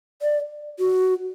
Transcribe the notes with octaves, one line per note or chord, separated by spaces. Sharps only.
D5
F#4